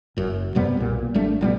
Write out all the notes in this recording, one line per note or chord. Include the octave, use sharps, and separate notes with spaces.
F#1 F#2
F2 C3 G3 B3
B1 A#2
G#1 G3 A3 D4
A#1 G3 B3